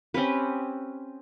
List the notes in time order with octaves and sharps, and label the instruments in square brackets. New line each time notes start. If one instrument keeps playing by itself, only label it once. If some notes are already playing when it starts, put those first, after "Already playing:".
[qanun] C4 C#4 G4 B4